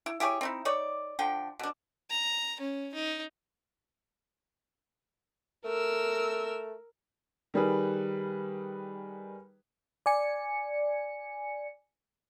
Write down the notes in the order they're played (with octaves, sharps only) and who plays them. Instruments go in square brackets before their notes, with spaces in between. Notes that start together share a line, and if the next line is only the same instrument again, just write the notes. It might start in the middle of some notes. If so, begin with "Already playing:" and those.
[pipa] E4
E4 G4 G#4 C#5
C4 D#4 E4
D#4 C#5 D5
D3 F3 G5
B2 D4
[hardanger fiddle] A#5
C#4
D#4
[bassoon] A3 [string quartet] A#4 E6
[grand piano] D#3 G3 G#4 B4
[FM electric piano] D5 G#5 C#7